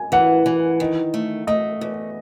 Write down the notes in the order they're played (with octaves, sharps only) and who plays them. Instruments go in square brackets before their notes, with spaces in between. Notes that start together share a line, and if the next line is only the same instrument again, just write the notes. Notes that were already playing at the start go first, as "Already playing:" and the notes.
Already playing: [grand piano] G#5
[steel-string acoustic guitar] E3 [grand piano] F#5
[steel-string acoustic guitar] E3
D#3
A3
[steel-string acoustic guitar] A3 [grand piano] D#5
[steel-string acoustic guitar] E2